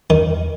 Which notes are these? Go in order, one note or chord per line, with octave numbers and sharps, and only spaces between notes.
E2 D#3